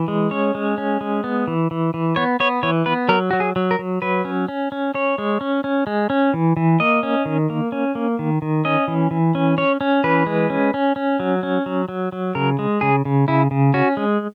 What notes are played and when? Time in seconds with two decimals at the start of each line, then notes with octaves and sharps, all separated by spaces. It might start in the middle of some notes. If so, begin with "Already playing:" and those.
Already playing: E3
0.08 G#3
0.31 C#4 C#5
0.55 G#3
0.78 C#4
1.01 G#3
1.24 B3
1.48 E3
1.71 E3
1.94 E3
2.16 B3 C#5
2.40 B3 C#5
2.63 E3 C#5
2.86 B3 B4
3.09 F#3 A#4
3.31 F#3 F#4
3.40 G#4
3.56 F#3
3.71 A#4
3.79 F#3
4.02 F#3 B4
4.25 C#4
4.48 C#4
4.72 C#4
4.94 C#4 C#5
5.18 G#3
5.41 C#4
5.64 C#4
5.87 G#3
6.10 C#4
6.34 E3
6.57 E3
6.80 A#3 D#5
7.03 C#4
7.25 D#3
7.50 A#3
7.72 C#4
7.95 A#3
8.19 D#3
8.42 D#3
8.65 C#4 D#5
8.88 E3
9.11 E3
9.35 C#4
9.58 C#4 C#5
9.81 C#4
10.04 E3 B4
10.26 G#3
10.50 C#4
10.74 C#4
10.96 C#4
11.20 F#3
11.43 C#4
11.66 F#3
11.89 F#3
12.12 F#3
12.35 C#3 A#4
12.59 G#3
12.81 C#3 G#4
13.05 C#3
13.28 C#3 E4
13.51 C#3
13.74 C#4 F#4
13.97 G#3